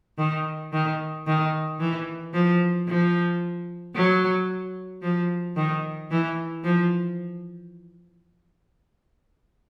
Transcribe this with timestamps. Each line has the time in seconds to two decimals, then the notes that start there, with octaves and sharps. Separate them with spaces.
0.18 D#3
0.73 D#3
1.26 D#3
1.79 E3
2.34 F3
2.87 F3
3.95 F#3
5.02 F3
5.56 D#3
6.10 E3
6.64 F3